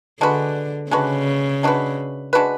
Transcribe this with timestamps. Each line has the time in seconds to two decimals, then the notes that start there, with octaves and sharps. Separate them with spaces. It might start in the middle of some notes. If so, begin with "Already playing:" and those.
0.21 D3 G#3 D4 F#4 B4
0.91 C#3 G#3 D4 F#4 B4
1.63 G#3 D4 F#4 B4
2.33 G#3 D4 F#4 B4